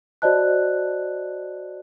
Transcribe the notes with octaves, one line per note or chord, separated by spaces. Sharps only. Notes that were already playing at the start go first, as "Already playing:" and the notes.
F#4 C5 D5 D#5 A5 F#6